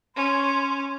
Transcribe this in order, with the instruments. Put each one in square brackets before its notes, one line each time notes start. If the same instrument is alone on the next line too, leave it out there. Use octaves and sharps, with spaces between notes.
[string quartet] C#4 [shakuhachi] C6